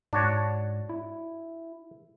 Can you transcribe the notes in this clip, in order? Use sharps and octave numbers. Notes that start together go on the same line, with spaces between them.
G#2 D4 F#4 C#5
E4